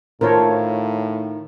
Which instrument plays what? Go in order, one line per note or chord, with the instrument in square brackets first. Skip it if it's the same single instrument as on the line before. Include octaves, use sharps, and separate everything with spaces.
[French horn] A2 [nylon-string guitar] D#3 F4 [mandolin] A3 E6 [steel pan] A#4 C5 C#5